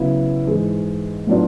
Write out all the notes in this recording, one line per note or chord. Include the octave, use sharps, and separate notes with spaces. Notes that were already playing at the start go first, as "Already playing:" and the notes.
Already playing: C#3 F#3 B3 E4
G#2 E3 G#3
A2 F#3 B3 D4 F4